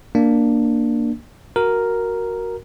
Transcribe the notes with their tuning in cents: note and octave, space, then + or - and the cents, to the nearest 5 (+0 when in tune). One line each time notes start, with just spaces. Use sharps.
A#3 +0 D4 +5
F#4 +0 A#4 +0